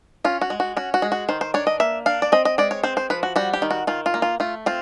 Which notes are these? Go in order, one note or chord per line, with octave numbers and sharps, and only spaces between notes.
C#4 F4
F#4
G#3
F#4
C#4 F#4
F#4
G#3
F#4
D#3 C5
C5
D4 C#5
D#5
A#3 E5
D4 F5
D5
C4 D#5
D#5
G#3 D5
C#5
C4 C5
C5
F3 B4
F#4
G3 F#4
G4
D#3
F#4
D#3 F4
F4
A#3
F4
A3 F4
C4 F4